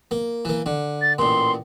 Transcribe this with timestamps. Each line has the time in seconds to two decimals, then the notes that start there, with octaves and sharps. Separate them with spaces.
0.11 A#3
0.45 E3 A#3
0.66 D3
1.02 A6
1.18 A1 A#2 C6